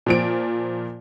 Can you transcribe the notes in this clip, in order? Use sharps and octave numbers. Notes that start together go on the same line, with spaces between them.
A#2 F3 D7